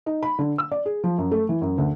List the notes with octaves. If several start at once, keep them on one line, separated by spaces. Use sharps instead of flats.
D#4
B5
D3
E6
D5
G#4
F3
F#2
A3
E3
F#2
D2